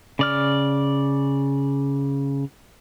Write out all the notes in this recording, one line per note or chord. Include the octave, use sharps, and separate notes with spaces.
C#3 D5 F6